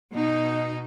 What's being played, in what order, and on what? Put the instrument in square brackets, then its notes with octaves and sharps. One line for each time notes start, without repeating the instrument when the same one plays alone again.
[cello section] B2 D#4